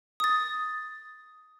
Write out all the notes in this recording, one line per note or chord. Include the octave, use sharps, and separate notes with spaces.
D#6 A6